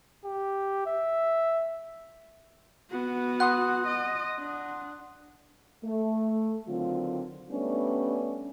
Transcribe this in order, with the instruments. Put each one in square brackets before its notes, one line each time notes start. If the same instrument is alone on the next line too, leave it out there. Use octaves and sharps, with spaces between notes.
[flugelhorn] G4
E5
[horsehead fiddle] B3 F#4
[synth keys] F#5 C6 D#6 [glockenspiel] F#6
[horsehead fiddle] D#5
D4
[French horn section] A3
D3 D#3 F#3 C4 F4
G3 A3 B3 C#4 D4